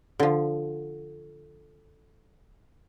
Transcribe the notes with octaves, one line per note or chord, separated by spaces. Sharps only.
D3 F3